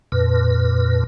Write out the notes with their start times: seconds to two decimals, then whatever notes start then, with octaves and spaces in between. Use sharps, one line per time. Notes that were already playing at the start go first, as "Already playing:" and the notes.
0.12 F2 A#2 B4